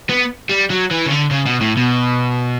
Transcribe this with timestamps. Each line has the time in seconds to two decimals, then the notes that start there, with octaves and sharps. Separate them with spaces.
0.09 B3
0.49 G3
0.70 F#3
0.91 E3
1.06 C#3
1.11 D3
1.31 C#3
1.46 B2
1.61 A2
1.77 B2